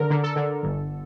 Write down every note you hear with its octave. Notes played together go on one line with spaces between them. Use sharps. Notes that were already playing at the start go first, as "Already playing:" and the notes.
Already playing: D3 A#4
D3
A4
D3
G1